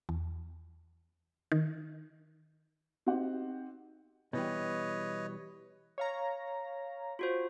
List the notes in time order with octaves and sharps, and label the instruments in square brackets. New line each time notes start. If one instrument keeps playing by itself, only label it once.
[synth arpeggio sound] E2
D#3
[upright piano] C4 D#4 F#4 G4 F#5
[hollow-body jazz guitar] B2 E3 G3 [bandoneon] B4 C#5 D#5
[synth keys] C#5 F5 A#5
[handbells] F4 F#4 C5